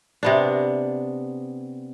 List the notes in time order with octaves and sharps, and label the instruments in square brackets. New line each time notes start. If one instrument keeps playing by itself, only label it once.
[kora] C3 B3 D4